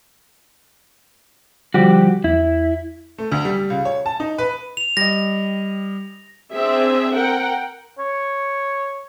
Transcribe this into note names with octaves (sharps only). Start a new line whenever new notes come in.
D3 F3 G3 F#4 G4
E2 E4
A3
D2
G3
C#2
C#5
A5
D#4
B4
F7
G3 D#5 A#6
C4 D4 G#4 E5
A#4 F#5 G5
C#5